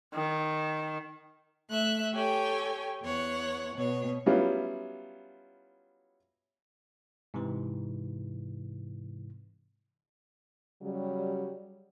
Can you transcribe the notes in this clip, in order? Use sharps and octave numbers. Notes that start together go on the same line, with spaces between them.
D#3
A3 E5 F#6
G4 A4 C#5 G5 G#5
E2 C#5 F#5
B2 C#5
F#3 G3 B3 C#4 E4 F4
G#2 C3 E3
C#3 F#3 G3